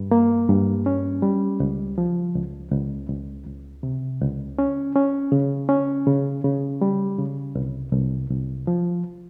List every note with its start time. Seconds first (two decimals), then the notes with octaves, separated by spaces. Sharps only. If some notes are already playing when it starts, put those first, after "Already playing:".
Already playing: G2
0.11 A#3
0.49 G2
0.86 C#4
1.22 G3
1.60 C#2
1.98 F3
2.35 C#2
2.72 C#2
3.10 C#2
3.47 C#2
3.83 C3
4.21 C#2
4.59 C#4
4.96 C#4
5.32 C#3
5.69 C#4
6.07 C#3
6.44 C#3
6.81 G3
7.18 C#3
7.55 C2
7.92 C2
8.30 C2
8.67 F3